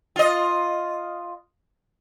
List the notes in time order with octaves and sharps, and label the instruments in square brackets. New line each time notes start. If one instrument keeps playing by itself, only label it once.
[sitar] F4 D#5